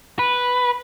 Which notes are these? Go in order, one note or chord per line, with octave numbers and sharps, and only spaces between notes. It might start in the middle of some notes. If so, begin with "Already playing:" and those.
B4